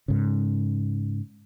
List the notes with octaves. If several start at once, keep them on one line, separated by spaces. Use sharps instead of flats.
G#2 C#3